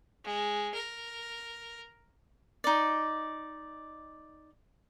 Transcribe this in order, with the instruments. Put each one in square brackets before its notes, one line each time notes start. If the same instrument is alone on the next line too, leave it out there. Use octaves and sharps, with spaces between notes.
[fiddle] G#3
A#4
[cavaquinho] D#4 D5